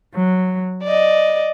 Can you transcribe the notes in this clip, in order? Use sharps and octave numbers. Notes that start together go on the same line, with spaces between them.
F#3
D5 D#5